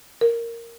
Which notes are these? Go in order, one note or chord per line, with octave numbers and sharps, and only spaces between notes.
A#4